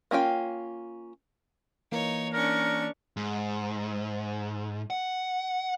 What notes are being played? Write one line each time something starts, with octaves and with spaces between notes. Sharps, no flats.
A#3 C#4 F4 G5
E3 A#3 D#4 C#5
C#4 D4 A#4 C#6
G#2
F#5